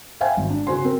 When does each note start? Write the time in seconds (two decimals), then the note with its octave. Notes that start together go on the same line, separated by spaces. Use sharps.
0.21 C5 E5 F5 G5 G#5
0.37 G#1
0.50 D4
0.67 C#3 F#4 C5 G#5 C6
0.85 C4 A#4